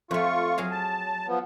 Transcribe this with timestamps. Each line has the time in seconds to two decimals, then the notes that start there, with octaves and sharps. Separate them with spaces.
0.11 F2 A3 F4 C#6
0.58 F#3 G#4 F5
0.71 A5
1.28 F3 B3